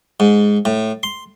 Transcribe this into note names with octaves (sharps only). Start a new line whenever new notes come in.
G#2
A2
C6